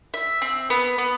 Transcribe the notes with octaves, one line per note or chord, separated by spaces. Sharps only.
E5
C4
B3
B3